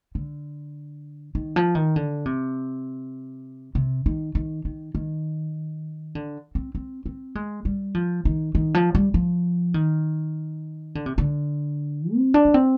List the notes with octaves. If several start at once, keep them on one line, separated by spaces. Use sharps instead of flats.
D3
D#3
F3
D#3
D3
C3
C3
D#3
D#3
D#3
D#3
D3
C4
C4
C4
G#3
G3
F3
D#3
D#3
F3
G3
F3
D#3
D3
C3
D3
C4
D4
A#3
C4